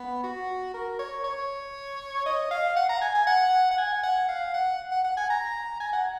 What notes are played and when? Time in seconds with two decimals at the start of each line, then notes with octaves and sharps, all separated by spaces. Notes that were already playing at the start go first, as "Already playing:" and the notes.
Already playing: B3
0.23 F#4
0.74 A#4
0.99 C#5
1.24 C#5
2.26 D#5
2.51 F5
2.76 F#5
2.89 A#5
3.01 G#5
3.15 G#5
3.27 F#5
3.71 F#5
3.78 G#5
4.03 F#5
4.29 F5
4.54 F#5
4.91 F#5
5.04 F#5
5.17 G#5
5.30 A#5
5.80 G#5
5.93 F#5